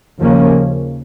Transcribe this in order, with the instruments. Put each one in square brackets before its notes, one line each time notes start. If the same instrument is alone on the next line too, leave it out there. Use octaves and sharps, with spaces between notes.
[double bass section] D#2 C#3 F3 A#3 C#4